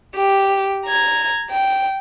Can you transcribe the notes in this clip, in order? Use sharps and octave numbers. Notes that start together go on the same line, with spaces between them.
G4
A#5 G#6
G5